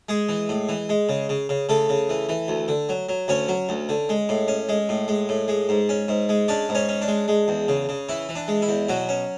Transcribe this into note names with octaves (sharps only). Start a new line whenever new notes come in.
G#3 G#4
E3
A2
E3
G#3
C#3
C#3
C#3
C#3 A3 A4
C#3
E3
E3
D2
D3
F#3
F#3
D2 C#4 C#5
F#3
D2
D3
G#3
A2
C#4
G#3
A2
G#3
A2
G#3
G#2
C#4
G#2
G#3
C#4 D4 D5
G#2
C#4 C#5
C#4
D4
G#3
G#3
E2
C#3
C#3
E3 E4
E3
D4
G#3
E4
E2
B2 F#3 F#4
C#4